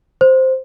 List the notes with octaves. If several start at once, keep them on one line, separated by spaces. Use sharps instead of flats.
C5